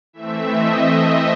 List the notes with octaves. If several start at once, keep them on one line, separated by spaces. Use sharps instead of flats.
E3 A3 C4 E5
D#5
D#5